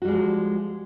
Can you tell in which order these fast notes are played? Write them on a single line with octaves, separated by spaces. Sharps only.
F#4 G3 G#3 F3